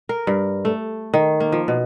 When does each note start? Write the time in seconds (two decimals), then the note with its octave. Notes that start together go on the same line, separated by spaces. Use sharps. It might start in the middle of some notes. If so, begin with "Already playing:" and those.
0.09 A#4
0.27 G2
0.65 A3
1.14 D#3
1.40 A#3
1.52 F3
1.68 B2